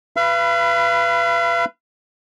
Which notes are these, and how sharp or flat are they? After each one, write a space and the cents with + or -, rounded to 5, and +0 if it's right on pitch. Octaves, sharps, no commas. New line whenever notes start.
B4 +0 F5 -40 B5 +10